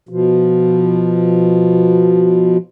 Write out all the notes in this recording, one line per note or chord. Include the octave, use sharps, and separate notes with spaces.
B2 F3